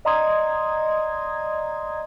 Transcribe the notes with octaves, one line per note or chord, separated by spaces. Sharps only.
D5 D#5 A#5 C6 D#6 G#6